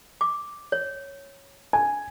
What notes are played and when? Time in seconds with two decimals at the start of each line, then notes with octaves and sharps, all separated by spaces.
0.21 D6
0.72 C#5
1.73 G#5